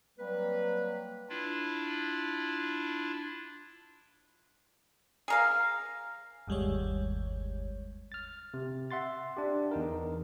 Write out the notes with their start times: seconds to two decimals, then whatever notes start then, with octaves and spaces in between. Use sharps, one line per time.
0.18 F#3 G3 A#3 C4 B4
1.29 D4 E4 F4
5.28 G#4 A#4 F5
6.47 G1 D#2 G3 G#3 C#5
8.12 F6 A6
8.54 C3
8.91 E5 F#5 C6 A6
9.37 D4 G4
9.71 E2 D#4 A#4